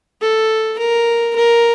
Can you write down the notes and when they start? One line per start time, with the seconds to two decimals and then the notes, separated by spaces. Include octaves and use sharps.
0.21 A4
0.78 A#4
1.35 A#4